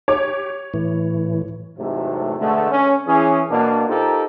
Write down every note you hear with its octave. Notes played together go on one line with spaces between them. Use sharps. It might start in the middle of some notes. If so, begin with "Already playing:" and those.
G4 C#5 D6
A2 E3
E2 G#2 C3 F#3 A3
B2 D3 G#3 A3
C#4
E3 C#4 G#4
B2 A#3 D4
D#4 F4 G4 A4 A#4 C5